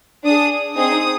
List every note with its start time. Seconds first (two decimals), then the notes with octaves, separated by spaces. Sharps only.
0.25 D4 G#4 D#6
0.76 C4 D#4 G#4 D#6